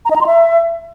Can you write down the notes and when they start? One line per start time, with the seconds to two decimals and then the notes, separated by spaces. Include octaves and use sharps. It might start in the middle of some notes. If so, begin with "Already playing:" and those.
0.05 A#5
0.11 D#5
0.16 A#5
0.21 C6
0.26 E5